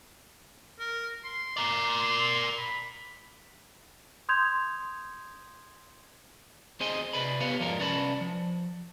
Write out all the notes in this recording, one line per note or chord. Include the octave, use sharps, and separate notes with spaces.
A#4
C6
A#4 D5
C6
B5
C6 D#6 G6 G#6 F7
C4 G#4 C5 D#5 G#5 C6
C3 B4 D5 B5
B3 G4 B4 C#5 F5
F2 G#2 F3 G#3 A#4 D5
C2 C#4 B4 D5 A5 B5
F3